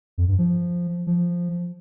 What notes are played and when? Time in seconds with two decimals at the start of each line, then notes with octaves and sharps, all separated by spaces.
0.18 F2
0.28 G2
0.38 F3
1.07 F3